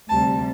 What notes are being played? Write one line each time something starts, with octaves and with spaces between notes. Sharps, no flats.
D2 C3 G3 A5